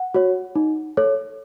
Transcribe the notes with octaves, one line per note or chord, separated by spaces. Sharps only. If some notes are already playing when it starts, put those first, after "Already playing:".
Already playing: F#5
F#4 C#5
D#4
A4 C#5